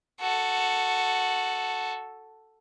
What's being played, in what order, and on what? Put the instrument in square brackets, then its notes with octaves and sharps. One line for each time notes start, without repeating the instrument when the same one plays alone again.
[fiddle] F#4 A4